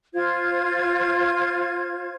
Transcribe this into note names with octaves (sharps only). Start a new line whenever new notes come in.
F4 C5 G#6